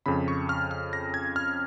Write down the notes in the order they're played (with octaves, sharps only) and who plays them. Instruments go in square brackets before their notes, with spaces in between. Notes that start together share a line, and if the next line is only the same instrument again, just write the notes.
[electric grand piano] F2 C#3 B5
C#6
F6
F6
A#6
G#6
F6